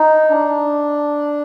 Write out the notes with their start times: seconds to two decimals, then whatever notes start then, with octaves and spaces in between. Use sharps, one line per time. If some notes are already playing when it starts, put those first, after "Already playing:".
Already playing: D#4
0.30 D4